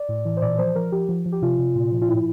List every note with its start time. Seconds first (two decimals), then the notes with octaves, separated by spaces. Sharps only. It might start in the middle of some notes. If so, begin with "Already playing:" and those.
Already playing: D5
0.09 A2
0.25 E3
0.37 C5
0.42 A#2 D5
0.59 F3 C5
0.75 F3 A#4
0.92 F3 G4
1.09 F3
1.26 F3
1.32 G4
1.42 C3 F4
1.59 C3
1.76 A#2
1.92 F3
2.02 F4
2.09 A2 E4